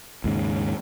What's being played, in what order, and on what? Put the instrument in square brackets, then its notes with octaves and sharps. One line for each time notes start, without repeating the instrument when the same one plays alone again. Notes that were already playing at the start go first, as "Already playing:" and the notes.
[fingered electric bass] D#2 G#2 C#3